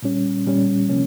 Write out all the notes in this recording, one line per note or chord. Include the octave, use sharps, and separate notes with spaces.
A#2 G3 C#4
A#2 G3 C#4
C3 F3 A#3 C#4